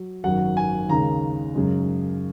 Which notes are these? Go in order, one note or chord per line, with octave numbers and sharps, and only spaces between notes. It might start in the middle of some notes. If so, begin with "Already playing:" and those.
Already playing: F#3
G#1 F#2 F#3 F#5
G#5
D#2 C#3 G#3 A#5
F#2 C#3 G#3